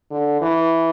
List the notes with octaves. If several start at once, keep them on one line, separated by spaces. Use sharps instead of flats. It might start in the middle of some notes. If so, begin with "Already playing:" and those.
D3
E3